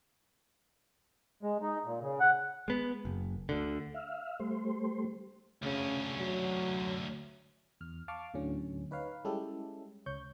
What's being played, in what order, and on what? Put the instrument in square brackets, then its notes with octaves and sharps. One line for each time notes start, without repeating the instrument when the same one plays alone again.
[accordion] G#3
D#4
A#2
C#3
F#5
[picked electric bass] G#3 B3
F#1
D2 D3
[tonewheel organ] E5 F5
G3 A3 C5
[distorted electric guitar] D2 C#4 [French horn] C#3
[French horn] F#3
[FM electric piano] E2 F6
F5 A5 C#6 D6 F6
D2 A2 D3 F#3 C#4
D#4 B4 C#5 F5
G3 G#3 C#4 E4 G4 A4
C#2 C#5 C#6 G6